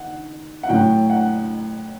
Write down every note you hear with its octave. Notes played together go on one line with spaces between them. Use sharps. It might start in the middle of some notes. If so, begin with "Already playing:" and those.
Already playing: D#3 F#5
F#5
A2 F#3 A3 G5
F#5